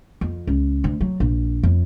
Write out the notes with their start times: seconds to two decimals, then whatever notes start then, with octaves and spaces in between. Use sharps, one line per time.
0.21 F2
0.47 C#2
0.84 D2
1.01 F#3
1.20 A#1
1.63 F2